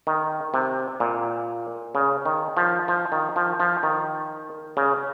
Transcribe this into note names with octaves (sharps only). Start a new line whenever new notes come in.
D#3
C3
A#2
C#3
D#3
F3
F3
D#3
F3
F3
D#3
C#3